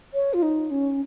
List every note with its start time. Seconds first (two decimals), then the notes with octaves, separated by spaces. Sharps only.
0.14 C#5
0.34 F4
0.43 D#4
0.71 C#4